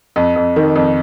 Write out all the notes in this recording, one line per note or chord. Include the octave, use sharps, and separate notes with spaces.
F2
F2
D#3
F2